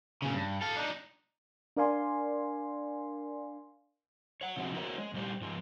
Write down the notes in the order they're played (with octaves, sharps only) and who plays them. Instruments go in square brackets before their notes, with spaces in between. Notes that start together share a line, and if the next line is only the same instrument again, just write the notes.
[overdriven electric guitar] A#2 C#3
G2
A4 F5
D4 D#4
[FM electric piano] D4 A#4 D5 F5 G#5 C6
[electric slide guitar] C#5 F#5
C3 F3 G#3 C4 F#4
D#4 E4 F#4 A#4 C5 C#5
G#3
A#2 G3 G4 C5
G#2 F3 G#3